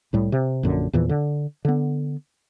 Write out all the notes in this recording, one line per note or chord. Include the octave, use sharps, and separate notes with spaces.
C2 A2 G3
C3
A#1 F#2 D3
E2 A#2 E3 F3
D3
D3 B3